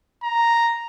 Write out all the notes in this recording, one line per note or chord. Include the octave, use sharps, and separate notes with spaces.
A#5